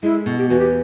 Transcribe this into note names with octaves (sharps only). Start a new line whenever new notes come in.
G#3 E4
B2
G4
E2 F#4
G4